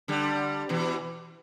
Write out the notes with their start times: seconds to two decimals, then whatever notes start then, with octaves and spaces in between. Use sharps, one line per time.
0.08 D3 G3
0.69 B2 E3